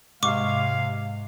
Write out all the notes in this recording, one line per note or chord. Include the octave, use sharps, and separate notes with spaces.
G#2 C3 G#3 F5 C#6 D6